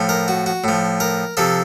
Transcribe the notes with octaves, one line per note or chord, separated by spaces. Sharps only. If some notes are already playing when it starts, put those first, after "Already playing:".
Already playing: A2 F3
A#4
F#4
F#4
A2 F3
A#4
C3 F3 A4